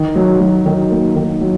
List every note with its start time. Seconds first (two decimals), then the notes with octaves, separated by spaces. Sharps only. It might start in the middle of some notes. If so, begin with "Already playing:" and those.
Already playing: D#3
0.16 F#3
0.41 F#3
0.66 D#3
0.91 A#3
1.16 D#3
1.41 F#3